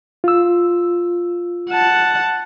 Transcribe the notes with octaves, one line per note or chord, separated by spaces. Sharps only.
F4 E6
F#5 A5